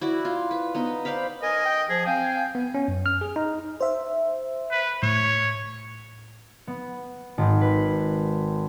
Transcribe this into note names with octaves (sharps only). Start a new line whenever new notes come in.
E4 F#4 D5
F4
B4
B3 D#4
C5 D5 F5 B5
A#4 D#5 G#5
G5
F3 G#4
C4 F5 G5 G#5
B3
C#4
F#2
F6
G#4
D#4
C5 E5
B4
A2 C#5
B3
G#1
B4